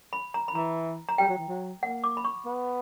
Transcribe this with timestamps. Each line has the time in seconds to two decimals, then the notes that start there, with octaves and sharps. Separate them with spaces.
0.13 B5
0.34 A#5
0.48 B5
0.55 E3 A#5
1.09 A#5
1.18 G3 G5
1.29 F#3
1.38 E3
1.48 F#3
1.83 A#3 F#5
2.04 D6
2.17 B5
2.25 C#6
2.46 B3